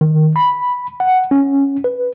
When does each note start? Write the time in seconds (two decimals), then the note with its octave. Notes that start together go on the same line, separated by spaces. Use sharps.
0.01 D#3
0.36 B5
1.00 F#5
1.31 C#4
1.84 B4